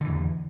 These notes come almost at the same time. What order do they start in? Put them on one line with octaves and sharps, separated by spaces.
D3 E3 E2